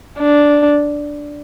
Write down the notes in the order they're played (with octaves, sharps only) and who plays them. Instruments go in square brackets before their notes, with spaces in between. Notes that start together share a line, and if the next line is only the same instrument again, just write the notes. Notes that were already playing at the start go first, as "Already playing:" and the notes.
[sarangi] D4